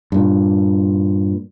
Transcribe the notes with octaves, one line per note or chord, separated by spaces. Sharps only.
G2 A#2